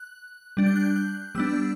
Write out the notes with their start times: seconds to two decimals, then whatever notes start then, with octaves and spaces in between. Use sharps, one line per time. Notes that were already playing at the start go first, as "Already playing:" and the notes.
Already playing: F#6
0.57 G3 D4
0.66 G6
0.76 F#6
0.85 G6
0.96 F#6
1.35 G3 B3 D4 E6